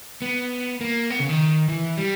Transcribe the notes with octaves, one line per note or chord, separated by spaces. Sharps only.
B3
A#3
B3
C#3
D#3
E3
G3